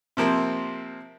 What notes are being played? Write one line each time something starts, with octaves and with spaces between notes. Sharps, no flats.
C3 F3 A#3 C4